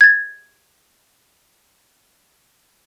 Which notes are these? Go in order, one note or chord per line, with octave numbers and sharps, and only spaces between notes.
G#6 A6